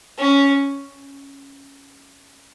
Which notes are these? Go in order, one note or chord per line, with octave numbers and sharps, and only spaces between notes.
C#4